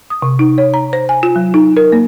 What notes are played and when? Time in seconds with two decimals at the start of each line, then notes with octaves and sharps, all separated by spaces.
0.10 D#6
0.22 C3
0.39 D#4
0.58 C#5
0.74 A#5
0.93 C5
1.09 G#5
1.23 F4
1.36 F#3
1.54 D#4
1.77 A#4
1.92 A#3